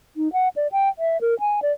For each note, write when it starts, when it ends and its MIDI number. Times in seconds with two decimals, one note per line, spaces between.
0.17 0.31 63
0.33 0.48 78
0.56 0.67 74
0.72 0.89 79
0.99 1.20 76
1.21 1.38 70
1.40 1.60 80
1.62 1.72 74